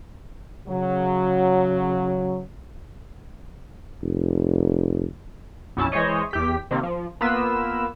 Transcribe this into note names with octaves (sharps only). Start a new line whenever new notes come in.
C#3 F#3
F1
B1 F#2 C#4 E4 A5
E3 G#3 C5 C#5 D#5
E2 G4 B6
C3 D#3 A#3 C4
F3
A#3 B3 F4 B4 E6